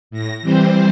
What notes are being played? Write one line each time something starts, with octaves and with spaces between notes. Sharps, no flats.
A2 A#6
E3 G3 C4 C5